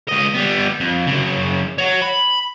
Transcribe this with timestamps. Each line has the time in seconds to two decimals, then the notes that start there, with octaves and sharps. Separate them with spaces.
0.09 C#2 D#5
0.34 G3 B3
0.81 F2
1.07 F#2 C#3
1.78 C#5 F#5
2.02 B5